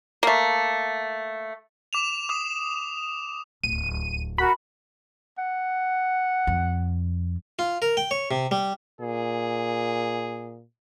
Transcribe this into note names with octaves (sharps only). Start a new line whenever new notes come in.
A3 A#3
D6 E7 F7
D6 D#6
D1 C#2 D#7
F#4 A#4 B5
F#5
F2
F4
A#4
G5
C#5
C3
G3
A#2 G#4